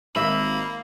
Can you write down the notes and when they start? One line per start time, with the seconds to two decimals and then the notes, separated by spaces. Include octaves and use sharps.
0.16 G#1 A#3 E5 B5